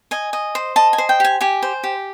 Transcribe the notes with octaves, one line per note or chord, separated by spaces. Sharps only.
D#5 G#5
D#5
C5
D#5 A5
G#5
C5
G5
G4 G#5
G4 G#5
C5
G4